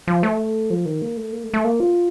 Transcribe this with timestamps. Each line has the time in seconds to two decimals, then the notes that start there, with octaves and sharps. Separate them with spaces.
0.07 F3
0.23 A3
0.70 F3
0.86 D#3
1.02 A#3
1.17 A3
1.33 A#3
1.43 A3
1.54 A3
1.64 A#3
1.80 F4